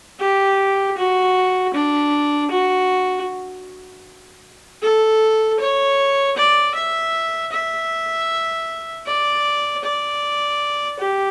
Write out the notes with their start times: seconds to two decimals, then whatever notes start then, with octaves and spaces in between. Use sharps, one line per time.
0.20 G4
0.97 F#4
1.74 D4
2.51 F#4
4.82 A4
5.60 C#5
6.37 D5
6.75 E5
7.52 E5
9.07 D5
9.84 D5
11.00 G4